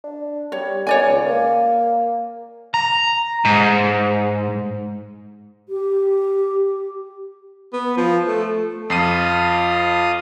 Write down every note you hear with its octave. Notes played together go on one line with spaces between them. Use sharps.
D4
G3 C#5
D#3 C#5 D5 G#5
C#2
A#3
A#5
G#2
G4
B3
F3
A3
F2 F4 D#6 C7 D#7